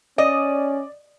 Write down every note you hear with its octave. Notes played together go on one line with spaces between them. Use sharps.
C#4 D5 D#5